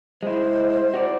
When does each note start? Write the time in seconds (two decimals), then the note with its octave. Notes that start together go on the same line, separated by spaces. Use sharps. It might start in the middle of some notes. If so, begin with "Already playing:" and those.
0.23 G#3 E4 C5
0.94 F#4 C#5 D5